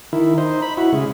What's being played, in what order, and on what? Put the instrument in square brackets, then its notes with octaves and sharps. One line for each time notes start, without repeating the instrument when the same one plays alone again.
[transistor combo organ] D#3 E4
D#4 C5
B5
E4 F#4
C#3 G#3